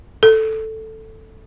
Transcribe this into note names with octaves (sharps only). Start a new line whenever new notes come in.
A4